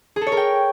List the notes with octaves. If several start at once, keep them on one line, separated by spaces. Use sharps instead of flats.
G#4
A4
C#5
A#4
G5